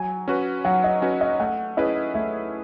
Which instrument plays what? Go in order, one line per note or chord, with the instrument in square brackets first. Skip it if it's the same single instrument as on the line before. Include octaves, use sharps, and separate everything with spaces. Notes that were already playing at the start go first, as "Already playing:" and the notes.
Already playing: [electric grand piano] F#3 [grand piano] G#5
[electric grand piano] C#4 F#4 B4
[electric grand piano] F#3 [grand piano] F#5
[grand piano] D#5
[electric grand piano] C#4 F#4 B4
[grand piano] D#5
[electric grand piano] A3 [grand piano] F#5
[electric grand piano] C#4 E4 G#4 B4 [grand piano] D#5
[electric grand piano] A3 [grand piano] E5